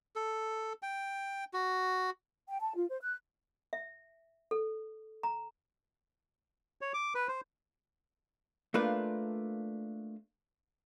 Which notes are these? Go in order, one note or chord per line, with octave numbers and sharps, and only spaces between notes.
A4
G5
F#4
G5
A5
F4
C5
F#6
E5
A4
A#5
C#5
D6
B4
C5
A3 A#3 D4 F4 B4